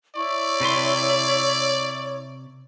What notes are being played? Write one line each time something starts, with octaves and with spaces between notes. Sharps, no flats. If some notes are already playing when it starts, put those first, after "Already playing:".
E4 C#5 D5 C#6
C3 B4 C6